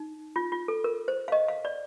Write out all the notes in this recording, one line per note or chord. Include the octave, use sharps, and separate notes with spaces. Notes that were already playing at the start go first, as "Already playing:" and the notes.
Already playing: D#4
F4
F4
A4
A#4
C5
F5
D#5
F5
D5